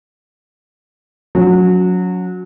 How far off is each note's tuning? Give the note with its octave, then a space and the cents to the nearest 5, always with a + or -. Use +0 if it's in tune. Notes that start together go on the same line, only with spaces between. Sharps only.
F#3 -20 C#4 +25